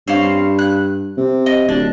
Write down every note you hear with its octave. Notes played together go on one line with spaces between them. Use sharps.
G2 C4 C#4 F5
F#6
C3
D#5
D1 D4